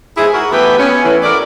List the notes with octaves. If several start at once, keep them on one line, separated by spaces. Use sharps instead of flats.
G#2 E4 G#4
F#4 A#4
E3 A3 B3 G4 B4 E5
B3 C#4
A2 E3
E4 F#4 G4 A4 A#4 D5